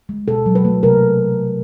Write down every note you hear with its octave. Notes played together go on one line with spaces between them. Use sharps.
G#3
B2 A4
F#3
B4
A3
C3 A#4